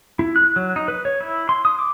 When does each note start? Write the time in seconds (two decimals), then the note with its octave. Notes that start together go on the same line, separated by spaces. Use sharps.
0.19 E4
0.36 F#6
0.56 F#3
0.76 D#4
0.88 B4
1.05 C#5
1.21 E4
1.49 C6
1.65 D#6
1.79 D6